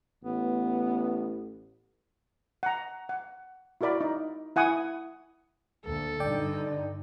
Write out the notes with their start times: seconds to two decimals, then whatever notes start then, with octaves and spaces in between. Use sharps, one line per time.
0.24 A1 B3
2.63 F#5 A#5
3.09 F#5
3.81 E4 F#4 A#4 D5 B5
4.01 D#4
4.56 E4 F#5 G#5 D#6
5.85 D2 A#3 A4
6.20 G2 D3 D#4 D5 G5